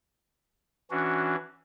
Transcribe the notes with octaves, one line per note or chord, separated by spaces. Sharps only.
E3 C#4 D4 F#4